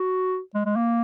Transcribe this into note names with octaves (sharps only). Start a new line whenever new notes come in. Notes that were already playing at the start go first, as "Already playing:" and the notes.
Already playing: F#4
G#3
G#3
A#3